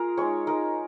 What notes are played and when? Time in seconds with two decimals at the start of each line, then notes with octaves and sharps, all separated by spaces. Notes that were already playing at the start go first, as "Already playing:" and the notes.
Already playing: F4 G#4 A#4
0.17 G#3 D#4 C#5
0.47 G#3 D#4 A#4